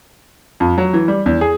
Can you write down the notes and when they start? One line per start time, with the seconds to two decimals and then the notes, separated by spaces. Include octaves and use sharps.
0.60 F2
0.78 F#3
0.93 E3
1.08 G3
1.26 E2
1.41 G#4